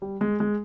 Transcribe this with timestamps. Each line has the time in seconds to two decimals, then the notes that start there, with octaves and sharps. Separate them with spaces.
0.02 G3
0.21 G#3
0.40 G#3